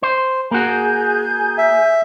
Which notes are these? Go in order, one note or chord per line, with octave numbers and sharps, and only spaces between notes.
C5
A#3 F#4 G#4 G#5 G6
E5